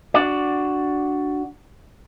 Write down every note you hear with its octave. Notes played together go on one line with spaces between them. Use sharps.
D4 F#4 D5